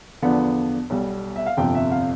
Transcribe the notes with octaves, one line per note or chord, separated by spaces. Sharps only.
E2 D3 F3 B3 D4
B1 B2 G3
E5
F5
G1 F2 C3 F3 G5
E5
F5